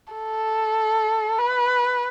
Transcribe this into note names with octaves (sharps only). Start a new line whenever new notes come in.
A4
B4